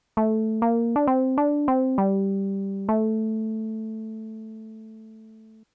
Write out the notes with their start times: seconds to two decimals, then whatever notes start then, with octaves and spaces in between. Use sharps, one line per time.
0.17 A3
0.62 A#3
0.96 D4
1.07 C4
1.38 D4
1.68 C4
1.98 G3
2.89 A3